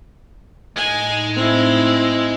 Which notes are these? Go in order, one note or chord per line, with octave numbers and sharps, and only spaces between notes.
A2 G#3 D#4 G#5
C4 E4